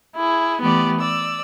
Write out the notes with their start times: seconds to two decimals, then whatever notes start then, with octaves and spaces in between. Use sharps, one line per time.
0.15 E4 G#4
0.60 E3 A3 B3 G4 D5
0.98 D5 E6